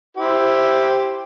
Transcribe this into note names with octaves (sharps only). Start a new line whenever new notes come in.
E4 G4 C5